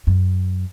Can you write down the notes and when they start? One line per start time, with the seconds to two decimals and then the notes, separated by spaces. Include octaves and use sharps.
0.07 F#2